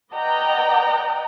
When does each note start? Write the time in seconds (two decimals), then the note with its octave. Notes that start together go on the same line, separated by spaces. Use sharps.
0.13 B4 D5 D#5 F#5 G5 A#5